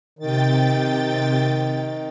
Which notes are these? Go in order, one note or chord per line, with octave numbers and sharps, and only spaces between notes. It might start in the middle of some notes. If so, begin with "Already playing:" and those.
C3 D#3 G5 A6